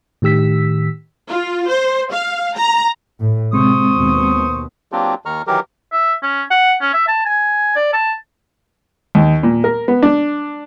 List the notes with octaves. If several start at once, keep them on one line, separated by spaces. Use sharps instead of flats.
A2 D#3 G4 E6 B6
F4
C5
F5
A#5
A2
C3 G#3 C4 C5 C#6 D#6
D#2 B2
F#3 A#3 C4 D4 F4 G4
D#2 D#3 A#5 C#6 F6
D#3 E3 F#3 G4 A#4
E5
C#4
F#5
C#4
E5
A5
G#5
D5
A5
D#2
A#2
A#4
B3
D4